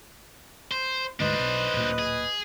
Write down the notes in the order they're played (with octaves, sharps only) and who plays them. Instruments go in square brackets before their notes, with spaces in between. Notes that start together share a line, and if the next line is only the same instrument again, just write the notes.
[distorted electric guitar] C5
[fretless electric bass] D2 G#2 [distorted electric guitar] D4 C5 [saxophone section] B4 D#5
[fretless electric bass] B1
D1 A#2
[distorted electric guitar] G#4